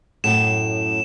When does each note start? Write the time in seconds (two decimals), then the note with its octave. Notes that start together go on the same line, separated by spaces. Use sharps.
0.24 F#2 A2 E7